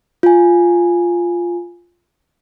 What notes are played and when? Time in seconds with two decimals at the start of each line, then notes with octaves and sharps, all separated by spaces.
0.23 F4 G#5